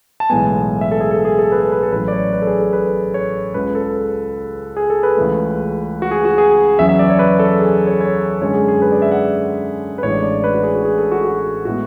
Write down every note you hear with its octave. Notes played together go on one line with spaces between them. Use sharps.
A5
B1 A2 E3 G#3 B3 G#5
E5
A4
G#4
A4
G#4
A4
B4
A4
B4
A4
A1 A2 F#3 B4
D5
C#5
B4
A4
G#4
A4
B4
C#5
C#2 C#3 G#3 B4
A4
G#4
A4
B4
C#2 C#3 E3 A3
F#4
G#4
F#4
G#4
E2 C#3 F#3 B3 E5
E5
D5
C#5
B4
A4
G#4
C#5
C#5
F#2 D3 G#3 C#4 C#5
G#4
G#4
B4
D5
E5
F#5
B4
A1 A2 G#3 D4 C#5
D5
D5
B4
F#4
G#4
F#4
G#4
A4
F#4
F#4
A2 G#3 B3 F#4